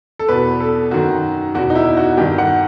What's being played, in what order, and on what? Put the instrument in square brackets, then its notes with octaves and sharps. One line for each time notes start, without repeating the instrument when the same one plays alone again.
[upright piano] A4
E2 B2 B4
A4
F#2 D#3 F#4
E2 F#4
B2
D#4
E4
F#4
G2 D#3 G4
F#5